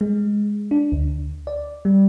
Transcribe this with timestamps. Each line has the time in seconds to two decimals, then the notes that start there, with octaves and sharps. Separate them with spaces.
0.01 G#3
0.71 D4
0.92 D2
1.47 D5
1.85 G3